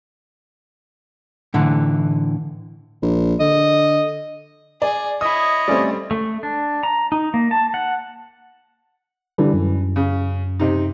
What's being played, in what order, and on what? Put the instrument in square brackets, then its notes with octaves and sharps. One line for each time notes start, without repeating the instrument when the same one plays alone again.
[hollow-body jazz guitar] A2 D3 E3
[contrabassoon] A#1
[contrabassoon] D3 [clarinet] D#5
[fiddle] G#4 [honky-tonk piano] D5
[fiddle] E4 C#5 [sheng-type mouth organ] D#5 [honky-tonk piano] D#6
[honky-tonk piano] G3 C4 [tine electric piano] A3 C#4 D5
[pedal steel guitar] A3
D4
A#5
D#4
A#3
A5
F#5
[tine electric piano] D3 G3 D4 [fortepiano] E3
[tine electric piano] F#2
[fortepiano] C#3
C3 D#4